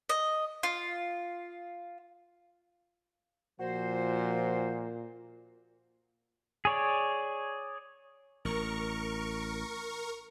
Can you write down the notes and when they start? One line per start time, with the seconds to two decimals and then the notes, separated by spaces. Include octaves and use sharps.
0.09 D#5
0.63 F4
3.60 A#2 F3 F#4 C5
6.65 G#4 C#5 D5
8.45 A1 A#4 C#6